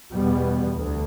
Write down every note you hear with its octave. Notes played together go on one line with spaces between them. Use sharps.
E2 B2 G3 B3
D2